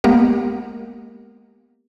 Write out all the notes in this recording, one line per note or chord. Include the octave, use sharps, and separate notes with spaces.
G#3 A#3 B3 G4 A#4